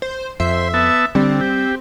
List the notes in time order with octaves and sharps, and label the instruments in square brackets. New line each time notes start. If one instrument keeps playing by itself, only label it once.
[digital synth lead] C5
[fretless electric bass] F2 [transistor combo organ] C5 [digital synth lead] E5
[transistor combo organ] B3 A5 E6
[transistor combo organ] D3 [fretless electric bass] G3 [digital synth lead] C4
[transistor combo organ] G4